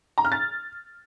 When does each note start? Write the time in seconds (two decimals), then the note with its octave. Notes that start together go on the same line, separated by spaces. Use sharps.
0.18 A#5
0.25 F6
0.32 A6